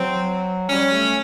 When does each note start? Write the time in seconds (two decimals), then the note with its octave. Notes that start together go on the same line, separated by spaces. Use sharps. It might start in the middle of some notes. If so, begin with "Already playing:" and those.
Already playing: F#3 C4
0.70 G3 C#4
0.93 A3